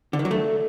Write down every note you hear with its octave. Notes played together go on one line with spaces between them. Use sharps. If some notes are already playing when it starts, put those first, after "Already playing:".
D3
D#3
F#3
A3